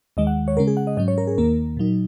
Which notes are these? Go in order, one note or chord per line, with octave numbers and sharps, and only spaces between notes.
D#2 D#3 G#3 D#5
F#5
C#5
C#3 G#3 C#4 A#4
G#4
F#5
D#5
G#2 F#3 C#4 D#5
C#5
A#4
G#4
D#2 D#3 A#3 A#4
A#2 F#3 D#4